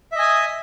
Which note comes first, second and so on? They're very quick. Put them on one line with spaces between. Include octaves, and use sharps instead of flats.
E5 D#5 G#5 D#6